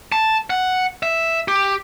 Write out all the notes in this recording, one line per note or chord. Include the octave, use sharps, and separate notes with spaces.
A5
F#5
E5
G4